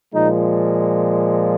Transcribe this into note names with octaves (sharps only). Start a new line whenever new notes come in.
A#2 F3 G#3 D#4